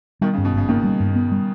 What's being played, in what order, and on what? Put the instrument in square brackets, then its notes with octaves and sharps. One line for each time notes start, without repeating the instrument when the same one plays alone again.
[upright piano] B2 D#3 [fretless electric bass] G3
[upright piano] C#3
[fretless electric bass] G2
[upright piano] B2
[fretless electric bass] G#1 [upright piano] C#3
[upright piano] B2 D#3 [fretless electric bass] A#3
[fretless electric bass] G3
G2
B3
G3